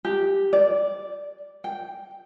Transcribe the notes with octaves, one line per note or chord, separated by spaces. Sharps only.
G4
D5
G5